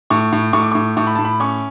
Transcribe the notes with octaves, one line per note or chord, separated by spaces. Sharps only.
A2 C#6
A2
A2 C#6
D6
A2 C#6
A2 C#6
B5
A2 A5
B5
C#4 C#6